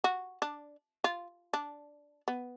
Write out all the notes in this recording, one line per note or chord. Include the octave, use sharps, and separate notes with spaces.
F#4
D4
F4
D4
B3